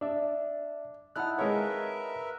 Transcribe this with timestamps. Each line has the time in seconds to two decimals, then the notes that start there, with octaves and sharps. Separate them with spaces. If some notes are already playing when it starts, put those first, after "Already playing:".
0.01 D4 D5 E5
1.16 D#4 E4 F#5 A5 D#6 F6 F#6
1.38 G#3 A#4 B4 C#5 E5 F5